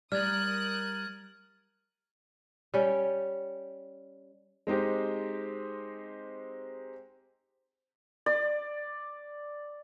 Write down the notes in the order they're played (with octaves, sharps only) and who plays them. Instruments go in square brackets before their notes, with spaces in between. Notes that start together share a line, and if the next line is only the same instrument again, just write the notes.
[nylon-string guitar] G3 [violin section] A#4 D#6 F#6 [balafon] D5 [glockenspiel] F6 G#6 A6
[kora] G3 C#4 G5
[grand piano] G#3 C4 D#4 G4
[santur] D5